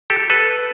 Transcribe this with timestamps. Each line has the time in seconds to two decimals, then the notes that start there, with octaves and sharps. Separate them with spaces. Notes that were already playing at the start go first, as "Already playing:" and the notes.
0.10 G4 A4
0.30 A4 B4